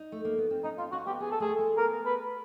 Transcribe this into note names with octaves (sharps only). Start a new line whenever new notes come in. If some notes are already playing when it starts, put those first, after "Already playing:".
Already playing: D#4
A3
A#3
B3
C4
C#4 D#4
C4 F4
C#4 F#4
B3 G4
B3 G#4
A4
A3 G#4
G#3
B3 A#4
B4